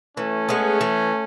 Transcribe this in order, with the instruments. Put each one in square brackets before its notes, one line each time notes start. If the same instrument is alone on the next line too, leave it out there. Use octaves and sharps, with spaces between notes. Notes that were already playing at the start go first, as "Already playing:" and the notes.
[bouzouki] E3 [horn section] A3 C#4
[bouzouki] G#3 B3
E3